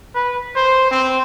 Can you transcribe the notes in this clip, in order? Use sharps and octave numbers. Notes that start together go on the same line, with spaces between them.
B4
C5
C4